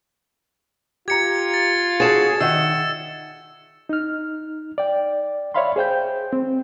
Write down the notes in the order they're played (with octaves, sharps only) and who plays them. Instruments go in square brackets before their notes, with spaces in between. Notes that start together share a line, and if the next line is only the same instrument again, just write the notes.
[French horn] F4 [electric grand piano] G4 A#5 [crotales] G#6 C#7
[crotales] A6
[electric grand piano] F#4 C#5 F5 [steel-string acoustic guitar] G#4 A4 [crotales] A6 E7
[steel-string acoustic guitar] D#3 [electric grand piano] E5 F#5 [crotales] E6
[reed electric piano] D#4 F6
D5 G5
C#5 D5 E5 F5 B5 C6
G#4 C5 G5 G6
C4